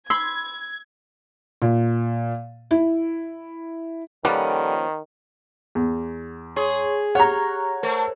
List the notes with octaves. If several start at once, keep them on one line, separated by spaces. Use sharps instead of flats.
B5 C6 E6 G#6
A#2
E4
D#3 F3 G3 A#3 C#4 A4 B4 F#5
E2
G#4 C#5 C6 C#6
G4 C#5 F#5 A#5 C#6 F6
A3 A#4 C5